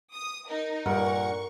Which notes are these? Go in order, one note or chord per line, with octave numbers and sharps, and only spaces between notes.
D#6
D#4 A#4
G2 A#2 A#4 F#5 C#6